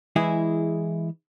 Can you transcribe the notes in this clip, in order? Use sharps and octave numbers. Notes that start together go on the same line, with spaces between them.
E3 G#3 E4 G#4